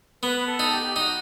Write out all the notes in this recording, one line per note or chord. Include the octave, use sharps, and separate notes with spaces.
B3 B4
A4
D#4
G4
G4
D#4 F#4